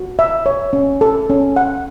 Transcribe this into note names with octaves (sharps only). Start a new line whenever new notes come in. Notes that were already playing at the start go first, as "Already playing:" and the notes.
Already playing: F#4
E5
C#5
C#4
A4
C#4
F#5